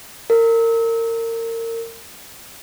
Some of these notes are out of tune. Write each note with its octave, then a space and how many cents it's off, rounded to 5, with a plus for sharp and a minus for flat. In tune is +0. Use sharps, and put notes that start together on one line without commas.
A#4 -30